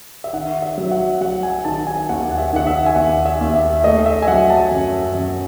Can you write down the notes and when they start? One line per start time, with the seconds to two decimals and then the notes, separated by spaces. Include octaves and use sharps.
0.24 E5
0.33 D#3 F#5
0.62 E5
0.78 F#3
0.91 F#5
1.21 F#3 F#5
1.43 G#5
1.65 D#3 A5
1.87 G#5
2.09 D#2 F#5
2.31 F#5
2.38 E5
2.53 D#3 F#5
2.67 E5
2.86 G#5
2.96 D#2 F#5
3.26 E5
3.41 D#2
3.54 E5
3.84 A3 D#5
4.06 E5
4.22 G#5
4.28 F#3 F#5
4.50 A5
4.71 F#2
5.15 F#2